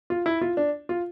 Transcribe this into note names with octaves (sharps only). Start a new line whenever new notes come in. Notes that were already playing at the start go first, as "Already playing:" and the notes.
F4
E4
F4
D4
F4